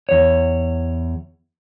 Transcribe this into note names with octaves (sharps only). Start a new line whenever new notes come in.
E2 C#5